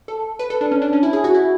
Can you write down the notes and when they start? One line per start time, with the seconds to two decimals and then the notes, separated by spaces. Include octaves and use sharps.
0.08 A4
0.39 B4
0.50 A4
0.61 D4
0.72 C#4
0.82 D4
0.93 C#4
1.03 E4
1.13 G#4
1.24 F#4
1.34 E4